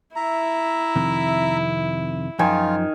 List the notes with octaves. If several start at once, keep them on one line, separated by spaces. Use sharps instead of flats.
E4 E5 A#5
F2 C3 D#3
F#2 D#3 F3 F4 G#5